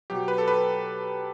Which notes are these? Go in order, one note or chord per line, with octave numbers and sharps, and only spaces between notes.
B2 F#3 G4
B4
A4
B4